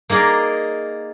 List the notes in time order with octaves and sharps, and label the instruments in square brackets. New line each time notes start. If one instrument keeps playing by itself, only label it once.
[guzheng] A#3 D#4 G#4 A#4 D5